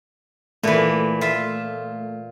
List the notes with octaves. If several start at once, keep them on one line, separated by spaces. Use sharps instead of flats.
A#2 E3 A3
F4 E5